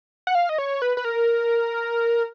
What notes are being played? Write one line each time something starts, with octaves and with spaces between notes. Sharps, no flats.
F#5
F5
D#5
C#5
B4
B4
A#4